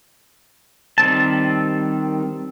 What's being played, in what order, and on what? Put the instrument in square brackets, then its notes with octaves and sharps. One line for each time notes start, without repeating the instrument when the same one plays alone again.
[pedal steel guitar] D#3 G3 C4 A5